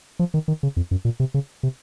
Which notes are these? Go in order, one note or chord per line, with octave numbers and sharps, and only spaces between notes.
F3
D#3
D#3
C#3
F2
F#2
A#2
C3
C#3
C3